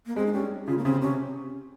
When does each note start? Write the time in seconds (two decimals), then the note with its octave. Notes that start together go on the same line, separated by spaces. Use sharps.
0.06 A#3
0.16 G#3 C4
0.26 D#4
0.33 G3 C#4
0.68 C#3 F4
0.78 A#3
0.84 C#3 C4
1.02 C3 C#4